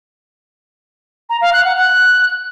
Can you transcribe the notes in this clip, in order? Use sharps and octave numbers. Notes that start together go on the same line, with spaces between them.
A#5
F5
F#6
F#5
F#6